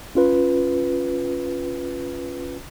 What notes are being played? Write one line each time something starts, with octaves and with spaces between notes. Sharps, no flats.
C#4 F4 B4